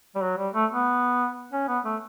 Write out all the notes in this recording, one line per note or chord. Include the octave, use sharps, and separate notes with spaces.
G3
F#3
G3
A3
B3
C#4
B3
A3